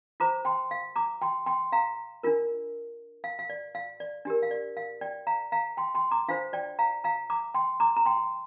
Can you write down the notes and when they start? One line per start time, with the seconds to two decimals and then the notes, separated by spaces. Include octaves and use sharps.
0.20 F4 C5 A#5 D6
0.45 G5 C6
0.71 F5
0.96 A#5 D6
1.22 G5 C6
1.46 G5 C6
1.72 F5 A#5
2.23 D4 F4 A#4
3.24 F5
3.39 F5
3.50 D5
3.75 F5
4.00 D5
4.25 D4 G4 A#4
4.43 F5
4.51 D5
4.77 F5
5.01 D5 G5
5.27 F5 A#5
5.52 F5 A#5
5.77 G5 C6
5.95 G5 C6
6.11 A#5 D6
6.28 D4 F4 C5 F5
6.53 D5 G5
6.79 F5 A#5
7.04 F5 A#5
7.30 A#5 D6
7.54 G5 C6
7.80 A#5 D6
7.96 A#5
8.05 G5 C6